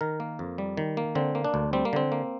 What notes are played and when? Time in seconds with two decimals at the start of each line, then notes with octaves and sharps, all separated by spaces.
0.01 D#3 A#4
0.20 A#3
0.39 F2
0.58 G3
0.77 D#3
0.97 A#3
1.15 D3 C4
1.35 A#3
1.44 D4
1.54 D2
1.73 G3 C4
1.85 A#3
1.93 D3 C4
2.12 A#3